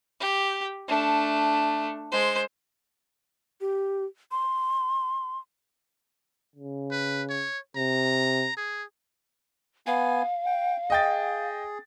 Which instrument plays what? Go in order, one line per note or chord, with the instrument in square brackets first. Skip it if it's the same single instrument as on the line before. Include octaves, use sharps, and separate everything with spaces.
[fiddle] G4
A3 D4
G#3 C5
[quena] G4
C6
[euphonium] C#3
[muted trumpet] B4
C#5
[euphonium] C3 [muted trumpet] A#5
[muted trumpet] G#4
[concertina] B3 G#5 [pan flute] F5
[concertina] G5
[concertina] G#4 [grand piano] D#5 G5 A6